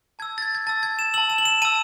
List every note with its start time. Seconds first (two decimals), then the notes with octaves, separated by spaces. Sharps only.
0.19 A5 E6 G#6
0.38 A6
0.42 G#6
0.55 G#6
0.67 A5 E6 A6
0.83 G#6
0.99 E7
1.14 A5 E6 F#7
1.30 E7
1.38 F#7
1.45 E7
1.62 A5 E6 D#7